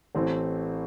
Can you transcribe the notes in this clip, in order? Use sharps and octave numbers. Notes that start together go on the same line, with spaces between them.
A1 A2 E3 A3 C4